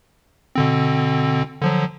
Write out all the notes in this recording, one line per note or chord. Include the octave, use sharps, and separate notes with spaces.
B2 D3 C4
D3 F3 F#3